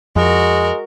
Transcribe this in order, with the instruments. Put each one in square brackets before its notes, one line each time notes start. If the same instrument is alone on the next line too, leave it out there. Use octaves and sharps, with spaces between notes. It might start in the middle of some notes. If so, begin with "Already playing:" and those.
[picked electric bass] F2 [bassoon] G#3 [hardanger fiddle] F#4 A#4